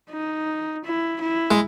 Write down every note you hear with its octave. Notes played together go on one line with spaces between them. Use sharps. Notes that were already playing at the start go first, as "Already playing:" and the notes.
D#4
E4
E4
G#3